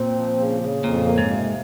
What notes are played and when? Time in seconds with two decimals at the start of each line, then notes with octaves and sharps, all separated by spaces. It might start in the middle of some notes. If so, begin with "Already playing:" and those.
Already playing: A#2 C4
0.15 F3
0.38 C#3
0.61 C#3
0.84 F2 A#2
1.05 A#3
1.18 G#2
1.29 C3